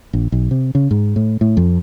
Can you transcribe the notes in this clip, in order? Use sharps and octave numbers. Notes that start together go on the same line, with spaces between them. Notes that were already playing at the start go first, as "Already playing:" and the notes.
A#1
B1
C3
C#3
G#2
A2
A2
F2